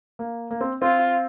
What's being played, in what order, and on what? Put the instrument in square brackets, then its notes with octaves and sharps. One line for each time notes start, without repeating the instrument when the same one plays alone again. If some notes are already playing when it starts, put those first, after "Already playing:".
[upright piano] A#3
A#3
C4
[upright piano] C4 [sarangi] F4